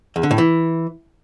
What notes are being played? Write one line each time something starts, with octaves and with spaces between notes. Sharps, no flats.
E2
D3
A2
E3